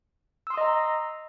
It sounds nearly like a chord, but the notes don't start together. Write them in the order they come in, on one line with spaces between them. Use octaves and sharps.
E6 C6 D#6 D#5 A#5